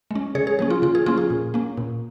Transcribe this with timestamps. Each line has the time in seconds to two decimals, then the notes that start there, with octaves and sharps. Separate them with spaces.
0.11 G#3 C#4
0.35 C#3 G#4 C#5
0.47 G#4
0.59 F3 A#3 C#4 G#4
0.70 F4
0.82 C#3 F4
0.95 G#4
1.06 F3 A#3 C#4 F4
1.18 G#4
1.30 A#2
1.54 A#3 C#4
1.77 A#2